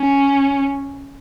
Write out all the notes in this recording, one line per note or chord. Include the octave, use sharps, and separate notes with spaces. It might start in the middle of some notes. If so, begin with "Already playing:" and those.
Already playing: C#4